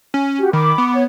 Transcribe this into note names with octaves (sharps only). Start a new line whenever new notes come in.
C#4
F#4 G4
D#3 B5 D6
B3
C#5